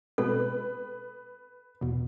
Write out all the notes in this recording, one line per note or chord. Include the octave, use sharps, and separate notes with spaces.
B2 G#3 C4 A4 B4
E2 B2